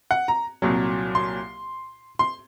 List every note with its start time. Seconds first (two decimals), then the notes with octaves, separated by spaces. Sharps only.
0.11 F#5
0.28 A#5
0.62 C2 A#2 F#3
1.15 C6
2.19 C6